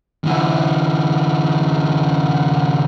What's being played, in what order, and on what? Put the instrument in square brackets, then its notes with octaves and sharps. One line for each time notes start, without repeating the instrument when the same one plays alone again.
[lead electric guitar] D3 E3